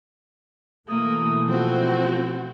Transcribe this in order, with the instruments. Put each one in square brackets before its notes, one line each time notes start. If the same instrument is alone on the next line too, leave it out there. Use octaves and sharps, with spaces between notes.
[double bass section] B2 E3 A3 [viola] A#3 [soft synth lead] D#6
[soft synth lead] F3 [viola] C4 F#4